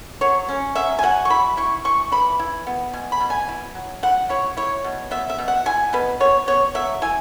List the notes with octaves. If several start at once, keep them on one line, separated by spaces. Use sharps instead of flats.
F#3 C#5
C#4
F#3 E5
G#5
F#3 F#5
C#6
E4 B5
E4 C#6
E3 C#6
E3 B5
E4
B3
B2 G#5
B5
B2
G#5
E4
F#3
E4 F#5
E4 C#5
E4 C#5
B2
B3 E5
E5
B2
F#5
E4 G#5
B2 B4
B3 C#5
B3 C#5
F#3 E5
E4 G#5